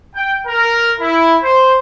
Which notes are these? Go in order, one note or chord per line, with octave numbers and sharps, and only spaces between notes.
G5
A#4
E4
C5